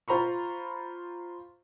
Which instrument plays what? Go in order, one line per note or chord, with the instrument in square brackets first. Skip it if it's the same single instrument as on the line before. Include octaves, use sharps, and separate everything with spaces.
[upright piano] F4 C5 A#5 B5 C#6